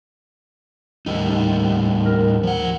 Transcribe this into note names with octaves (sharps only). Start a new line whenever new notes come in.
D#2 A2 G3 D#4
A#4
F3 F#5